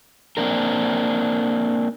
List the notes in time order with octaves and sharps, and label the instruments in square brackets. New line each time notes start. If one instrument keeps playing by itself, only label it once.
[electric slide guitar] A#3 C4 D4 A#4